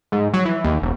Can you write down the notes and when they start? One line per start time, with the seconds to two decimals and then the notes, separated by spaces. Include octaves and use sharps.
0.12 G#2
0.34 F#3
0.45 E3
0.64 D#2
0.82 E1